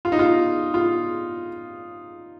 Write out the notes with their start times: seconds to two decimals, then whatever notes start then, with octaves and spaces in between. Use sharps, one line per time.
0.05 F4
0.12 D#4
0.19 F4
0.74 F4